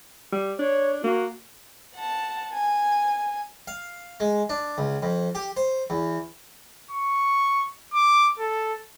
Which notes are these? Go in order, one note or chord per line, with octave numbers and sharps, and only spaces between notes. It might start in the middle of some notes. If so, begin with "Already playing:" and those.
G3
D4 C#5
A#3 F#4
F#5 A5
G#5
F5
G#3
D4
C#2
F2
G4
C5
E2
C#6
D6
A4